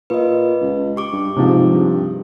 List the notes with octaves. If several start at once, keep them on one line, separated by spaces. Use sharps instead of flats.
A#2 B4 D#5
C#2
G4 C#6 D6
G2
G#2 C3 F3
G2